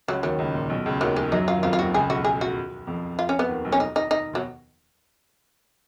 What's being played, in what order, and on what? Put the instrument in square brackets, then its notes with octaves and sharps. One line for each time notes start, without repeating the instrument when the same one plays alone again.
[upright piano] C#2 C#3 [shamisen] F#3
[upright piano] D#2 D#3 [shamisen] F#3
[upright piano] C#2 C#3
A#2
B1 B2
C#2 C#3
[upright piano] D#2 D#3 [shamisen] F#3
[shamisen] G#3
[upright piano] F#2 F#3 [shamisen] D#4
[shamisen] F4
[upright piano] D#3
[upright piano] F2 F3 [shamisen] F4
[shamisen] F4
[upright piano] D#2 D#3 [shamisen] F#4
[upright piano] C#2 C#3 [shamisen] G#4
[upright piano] B1 B2 [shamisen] F#4
[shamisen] G#4
F#4
[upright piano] F2 F3
[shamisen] F4
C#4
B3
[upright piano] D#2 D#3
B1 B2
[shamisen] C#4
D#4
D#4
D#4
[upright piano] B2 [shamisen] F#3